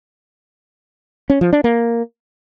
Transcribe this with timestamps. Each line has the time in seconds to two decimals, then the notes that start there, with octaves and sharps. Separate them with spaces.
1.30 C#4
1.41 F3
1.53 D4
1.64 A#3